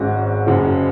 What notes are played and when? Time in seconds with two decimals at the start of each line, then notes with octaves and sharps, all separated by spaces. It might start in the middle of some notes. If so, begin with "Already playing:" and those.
Already playing: G#1 G#2 G#3 C#4 F#4
0.47 F#1 F#2 C#3